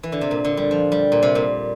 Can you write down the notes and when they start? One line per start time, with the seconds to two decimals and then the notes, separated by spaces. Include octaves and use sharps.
0.03 E3
0.12 D3
0.21 C3
0.31 A#2
0.45 D3
0.57 G3
0.71 F3
0.92 G3
1.12 A#2
1.23 C3
1.35 A#2